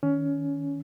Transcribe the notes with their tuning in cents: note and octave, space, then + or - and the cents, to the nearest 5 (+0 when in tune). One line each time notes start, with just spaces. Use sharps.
D#3 +0 C#4 +20